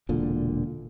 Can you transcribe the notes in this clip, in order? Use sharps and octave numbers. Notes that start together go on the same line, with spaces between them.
E1 A#2 D3